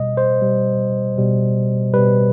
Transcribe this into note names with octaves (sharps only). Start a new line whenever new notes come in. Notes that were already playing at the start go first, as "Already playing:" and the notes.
Already playing: B2 G3 D#5
C5
B2 G3
B2 G3
B2 G3 B4